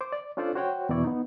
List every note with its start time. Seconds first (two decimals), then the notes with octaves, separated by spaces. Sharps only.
0.01 C5 D6
0.12 D5
0.37 C#4 D4 F4 A4 C5 D5
0.55 F#4 C5 C#5 F#5 G5
0.89 E2 B2 E3 E4 D5 C#6
1.04 B3 D#4